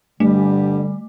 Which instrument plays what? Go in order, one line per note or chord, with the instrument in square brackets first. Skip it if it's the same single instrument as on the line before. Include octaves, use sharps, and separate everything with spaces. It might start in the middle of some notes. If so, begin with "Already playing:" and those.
[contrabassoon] G2 [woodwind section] D3 G3 [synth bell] A3